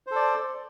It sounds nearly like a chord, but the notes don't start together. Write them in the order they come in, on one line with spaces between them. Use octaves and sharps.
C5 A4 D5